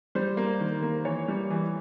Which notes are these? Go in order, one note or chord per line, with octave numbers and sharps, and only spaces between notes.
G3 C5
A#3
D#3
A#3
E3 C#5
G3
E3